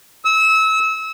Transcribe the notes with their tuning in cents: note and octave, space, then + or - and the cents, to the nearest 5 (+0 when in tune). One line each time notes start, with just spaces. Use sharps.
E6 -30